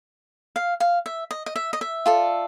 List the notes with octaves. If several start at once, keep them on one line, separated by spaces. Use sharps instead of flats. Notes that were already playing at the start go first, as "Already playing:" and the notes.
F5
F5
E5
D#5
D#5
E5
D#5
E5
F4 A4 D5